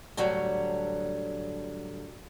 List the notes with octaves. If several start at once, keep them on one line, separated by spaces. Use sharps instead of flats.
A2 D3 F#3 G3